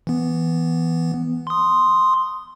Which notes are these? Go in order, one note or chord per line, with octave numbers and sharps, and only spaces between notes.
E3 B3
C6 D#6